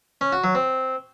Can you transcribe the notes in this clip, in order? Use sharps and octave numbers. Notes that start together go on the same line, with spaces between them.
C#4
F#4
F#3
C4